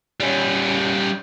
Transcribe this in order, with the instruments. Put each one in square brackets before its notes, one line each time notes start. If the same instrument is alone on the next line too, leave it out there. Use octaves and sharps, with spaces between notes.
[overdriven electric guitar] G3 C#4